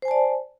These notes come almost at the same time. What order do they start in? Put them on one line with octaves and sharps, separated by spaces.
C5 G#5 A5 D5